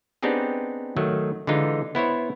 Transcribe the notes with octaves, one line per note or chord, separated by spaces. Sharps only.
B3 C4 D4 D#4 G4 G#4
D#3 F#3 A3
D3 E3 G#3 D#4 F4
B3 E4 C5 C#5